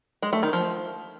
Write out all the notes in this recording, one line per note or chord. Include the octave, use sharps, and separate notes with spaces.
G#3
A3
D#3
F3